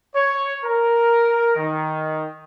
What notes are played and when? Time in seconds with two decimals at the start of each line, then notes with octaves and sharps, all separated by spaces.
0.15 C#5
0.64 A#4
1.56 D#3